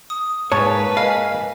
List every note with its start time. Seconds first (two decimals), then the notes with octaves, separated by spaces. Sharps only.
0.10 D#6
0.52 G#2 A#3 B4 C#5 A5
0.97 D#5 F5 G#5